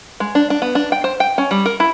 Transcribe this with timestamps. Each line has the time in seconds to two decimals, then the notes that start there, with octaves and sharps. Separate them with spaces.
0.20 G#3
0.35 D4
0.50 D4
0.62 B3
0.75 D4
0.92 G5
1.04 C5
1.20 G5
1.38 C#4
1.51 G3
1.66 A#4
1.80 E4